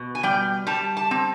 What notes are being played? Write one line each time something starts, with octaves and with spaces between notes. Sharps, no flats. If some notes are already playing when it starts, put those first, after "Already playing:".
Already playing: B2
G#5
G3 G5
G3 A5
A5
C4